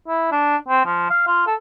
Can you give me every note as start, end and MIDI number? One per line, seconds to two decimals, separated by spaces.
0.08 0.27 64
0.32 0.56 62
0.68 0.84 60
0.86 1.09 53
1.10 1.23 77
1.27 1.46 65
1.47 1.55 69